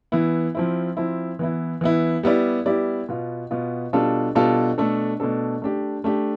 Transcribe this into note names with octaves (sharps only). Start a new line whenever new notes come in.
E3 B3 E4
F3 C4 E4
F3 C4 E4
E3 B3 E4
E3 B3 E4
G3 B3 E4 G4 D5
G3 B3 E4 G4 D5
B2 B3 F4
B2 B3 F4
B2 G3 D4 F4 A4
B2 G3 D4 F4 A4
B2 A3 D4 A4
B2 A3 D4 A4
A3 D4 G4
A3 D4 G4